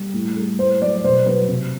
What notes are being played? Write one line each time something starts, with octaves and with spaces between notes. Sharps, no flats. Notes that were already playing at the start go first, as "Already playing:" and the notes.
Already playing: G3
A2
G3
A2 C5
F#3 D5
B2 C5
F#3 B4
C3